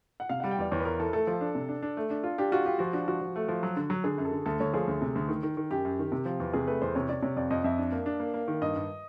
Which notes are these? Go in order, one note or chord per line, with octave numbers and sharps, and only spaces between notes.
F#5
C3 F5
G3 F#5
G5
E2 D5
E2 C#5
B4
E2 A#4
E3 A4
A3 A4
F3
D4
C3
D4
D4
A3
D4
F4
D4 G4
F4 F#4
F4 G4
F3 F#4
D4 F#4
F3 F#4
F3
A3
F3
F#3
D3
F#3
D3 G#4
F#2
A4
D3
D2 A4
D2 C#5
F3 G#4
D2
C3
D2
D#3
D#3
D#3
F#2 G4
F#2
D#3
C3
F3
E2
C3 G#4
A3 B4
E2 C5
C3 C#5
C3 D5
C3 C#5
F2 D5
F2 D#5
F2 E5
D4
A#3
D4
A#3
A#3
D#3
G2 D#5
G2